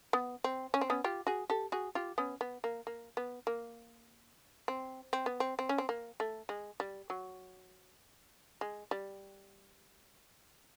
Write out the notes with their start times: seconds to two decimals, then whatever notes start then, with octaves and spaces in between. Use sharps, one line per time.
0.13 B3
0.44 C4
0.74 C#4
0.81 C4
0.90 B3 C#4
1.04 F4 G4
1.27 F#4 G#4
1.50 G4 A4
1.72 F#4 G#4
1.95 F4 G4
2.18 B3 C#4
2.41 B3
2.64 A#3
2.87 A#3
3.17 B3
3.47 A#3
4.68 C4
5.13 C4
5.26 B3
5.40 C4
5.59 C4
5.69 C#4
5.78 C4
5.89 A#3
6.20 A3
6.49 G#3
6.80 G3
7.10 F#3
8.61 G#3
8.91 G3